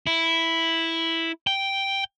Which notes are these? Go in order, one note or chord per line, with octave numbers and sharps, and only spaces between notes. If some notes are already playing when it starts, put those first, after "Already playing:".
E4
G5